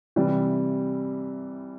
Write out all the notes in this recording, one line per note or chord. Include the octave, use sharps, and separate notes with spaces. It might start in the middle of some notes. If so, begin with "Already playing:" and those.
C3 E3 G3